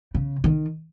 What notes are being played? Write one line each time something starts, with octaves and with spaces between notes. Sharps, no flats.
C#3
D#3